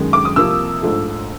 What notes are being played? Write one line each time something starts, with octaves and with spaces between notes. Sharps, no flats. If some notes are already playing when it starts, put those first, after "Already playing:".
Already playing: F#2 D#3 G#3
D6
D#6
C2 C3 F3 A#3 E6
A#1 G#2 F3 A3